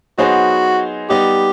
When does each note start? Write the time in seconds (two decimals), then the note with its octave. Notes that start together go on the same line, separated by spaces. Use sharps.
0.18 F#3 B3 D#4 F#4 G#4 C5
1.10 G3 B3 D#4 G4